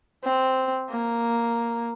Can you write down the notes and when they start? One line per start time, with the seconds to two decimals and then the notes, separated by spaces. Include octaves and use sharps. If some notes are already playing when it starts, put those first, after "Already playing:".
0.24 C4
0.91 A#3